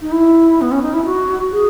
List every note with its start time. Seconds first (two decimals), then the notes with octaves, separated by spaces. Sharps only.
0.02 D#4
0.12 E4
0.61 B3
0.72 C#4
0.82 D#4
0.94 E4
1.06 F#4
1.52 G#4